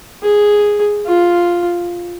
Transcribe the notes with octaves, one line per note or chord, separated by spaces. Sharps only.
G#4
F4